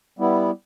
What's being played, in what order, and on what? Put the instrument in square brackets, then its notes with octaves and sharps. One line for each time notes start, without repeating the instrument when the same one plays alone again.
[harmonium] G3 B3 E4